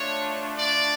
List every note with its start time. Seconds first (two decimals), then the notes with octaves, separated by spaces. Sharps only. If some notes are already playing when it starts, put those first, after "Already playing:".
Already playing: A3 D4 F4 C#5
0.57 D5